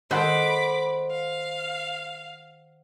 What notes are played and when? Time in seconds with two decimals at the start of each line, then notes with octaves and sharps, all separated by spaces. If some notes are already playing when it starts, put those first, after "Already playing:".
0.11 D#3 G#3 A4 C5 F#5 B5 D6
1.11 F5